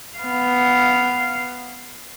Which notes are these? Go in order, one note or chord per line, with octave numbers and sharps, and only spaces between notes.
B3 F5